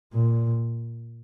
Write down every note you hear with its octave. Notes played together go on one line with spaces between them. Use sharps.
A#2